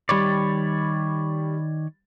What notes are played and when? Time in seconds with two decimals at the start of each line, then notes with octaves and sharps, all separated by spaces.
0.09 D#3 G3 C#5 D5 B5 A6